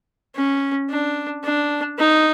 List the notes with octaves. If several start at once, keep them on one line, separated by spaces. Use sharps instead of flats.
C#4
D4
D4
D#4